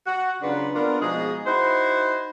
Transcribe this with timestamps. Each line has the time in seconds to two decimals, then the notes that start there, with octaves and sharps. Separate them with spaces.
0.07 F#4
0.42 C#3 F#3 D4 F4 B4 F#5
0.75 A#3 B3 D4 F4 A#4
1.01 B2 F3 G#3 D#4 G#4
1.46 D#4 E4 F#4 C5